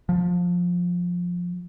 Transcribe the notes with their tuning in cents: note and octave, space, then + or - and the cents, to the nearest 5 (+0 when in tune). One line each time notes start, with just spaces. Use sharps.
F3 +15